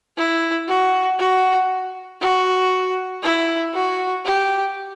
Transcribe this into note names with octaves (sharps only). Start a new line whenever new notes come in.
E4
F#4
F#4
F#4
E4
F#4
G4